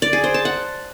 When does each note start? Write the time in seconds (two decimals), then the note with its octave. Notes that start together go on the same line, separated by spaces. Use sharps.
0.02 D5
0.13 G#4
0.24 C5
0.34 A5
0.45 F#5